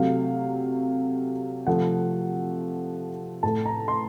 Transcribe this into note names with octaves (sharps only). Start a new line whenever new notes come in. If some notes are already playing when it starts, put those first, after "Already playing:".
Already playing: C3 F#3 A3 F5
C3 F3 A3 F#5
A2 A3 A5
A#5
C6